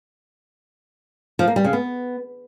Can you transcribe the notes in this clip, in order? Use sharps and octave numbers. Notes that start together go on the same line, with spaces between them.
F3
A#3
G3
C#3
B3